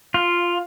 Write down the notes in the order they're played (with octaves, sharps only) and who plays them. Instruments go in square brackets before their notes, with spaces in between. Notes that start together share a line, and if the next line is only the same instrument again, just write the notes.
[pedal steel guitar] F4